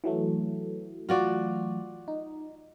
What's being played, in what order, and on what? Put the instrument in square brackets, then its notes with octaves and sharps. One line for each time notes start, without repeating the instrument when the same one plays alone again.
[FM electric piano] E3 F#3 A3
[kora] F4 F#4 D5
[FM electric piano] D#4